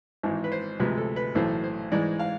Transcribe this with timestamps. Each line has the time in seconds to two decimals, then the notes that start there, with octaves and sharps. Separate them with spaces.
0.23 G#1 G#2 E3
0.44 B4
0.52 C5
0.80 D2 C3 F3 G#3 B4
0.98 A4
1.16 B4
1.35 B1 A2 E3 A3 C5
1.64 C5
1.92 G#2 E3 G#3 D5
2.19 F5